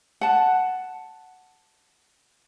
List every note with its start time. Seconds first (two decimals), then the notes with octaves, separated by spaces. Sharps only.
0.21 F#5 A5